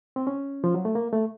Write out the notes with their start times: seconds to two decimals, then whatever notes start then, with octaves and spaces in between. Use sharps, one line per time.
0.16 C4
0.27 C#4
0.64 F3
0.74 F#3
0.85 A3
0.95 A#3
1.13 A3